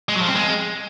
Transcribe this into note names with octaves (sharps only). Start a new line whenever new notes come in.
G#3
F#3
F3
C4
G#3